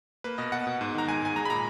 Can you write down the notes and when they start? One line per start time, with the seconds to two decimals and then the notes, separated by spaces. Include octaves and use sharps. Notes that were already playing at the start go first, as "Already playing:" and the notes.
0.24 A#3 B4
0.38 B2 D#5
0.52 B2 F#5
0.67 B2
0.81 G#2
0.95 D#3 A#5
1.08 G#2 G#5
1.22 G#2 G#5
1.36 G#3 A#5
1.45 B5
1.50 A#2 A#5